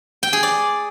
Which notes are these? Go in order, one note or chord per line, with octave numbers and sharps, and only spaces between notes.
G5
G#4
D5